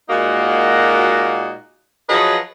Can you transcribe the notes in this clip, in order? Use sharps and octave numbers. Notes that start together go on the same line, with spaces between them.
A#2 G#3 A#3 D#4 F#4
F3 F#3 G#4 B4 C#5 D#5